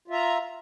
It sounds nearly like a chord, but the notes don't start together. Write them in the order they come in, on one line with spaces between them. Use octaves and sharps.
F4 E5 A#5